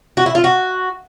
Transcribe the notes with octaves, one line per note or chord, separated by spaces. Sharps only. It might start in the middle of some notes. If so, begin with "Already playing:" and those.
F#4
E4
F4
F#4